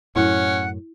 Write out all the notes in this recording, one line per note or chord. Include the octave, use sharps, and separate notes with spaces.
F#2 A2 C#4 E4 F#5